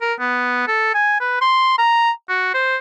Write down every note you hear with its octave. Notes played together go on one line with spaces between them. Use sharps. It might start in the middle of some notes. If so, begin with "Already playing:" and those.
A#4
B3
A4
G#5
B4
C6
A#5
F#4
C5